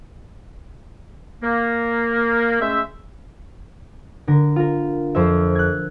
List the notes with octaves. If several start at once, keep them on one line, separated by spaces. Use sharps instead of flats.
A#3
G#3 A3 C#4 C5 E5
D3 A#4
F4 A#4
F2 C5 E5
F#6 G#6